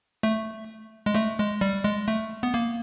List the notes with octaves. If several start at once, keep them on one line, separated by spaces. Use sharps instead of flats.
A3
G#3
A3
G#3
G3
G#3
A3
B3
A#3